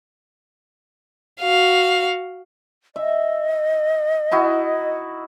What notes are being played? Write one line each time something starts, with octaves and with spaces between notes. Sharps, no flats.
F#4 F5
D#5 E5
D#4 E4 F#4